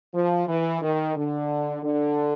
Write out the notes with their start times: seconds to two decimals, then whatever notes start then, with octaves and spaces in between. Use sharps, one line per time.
0.13 F3
0.48 E3
0.82 D#3
1.16 D3
1.83 D3